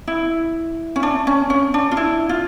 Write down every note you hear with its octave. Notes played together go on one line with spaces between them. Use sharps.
E4
C#4
D4
C#4
C#4
D4
F4
E4
F4